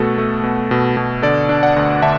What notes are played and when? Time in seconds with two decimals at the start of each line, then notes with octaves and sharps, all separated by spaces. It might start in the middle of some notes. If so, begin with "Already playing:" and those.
Already playing: B2 A3 F#4 A4
0.18 A3
0.43 B2
0.71 B2
0.97 B2
1.23 D3 A4 D5
1.49 D4
1.63 D5 F#5
1.76 D2
2.02 D3 E5 A5